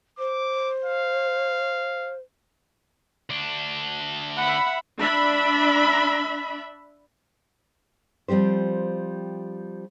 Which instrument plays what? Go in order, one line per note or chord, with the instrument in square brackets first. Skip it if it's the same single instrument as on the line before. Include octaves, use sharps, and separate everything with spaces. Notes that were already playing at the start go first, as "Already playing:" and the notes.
[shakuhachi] C5 [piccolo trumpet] D6
[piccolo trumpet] F5
[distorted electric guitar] D2 D4
[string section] E5 B5 [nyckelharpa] F#5
[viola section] D4 E5 B5
[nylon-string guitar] F3 G3 C4 G4 C5